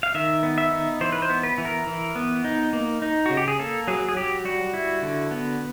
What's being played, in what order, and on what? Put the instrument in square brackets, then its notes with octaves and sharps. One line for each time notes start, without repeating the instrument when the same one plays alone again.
[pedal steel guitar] F5
D#3 E5
B3
E5
D#4
E3 C5
B4
C5
B3
B4
E3
A#4
E3
B3
D#4
A#3
D#4
C#3 F#4
G4
G#4
A#3 A4
F#3 G#4
G#4
F#3 G4
G3 F#4
E4
D3
B3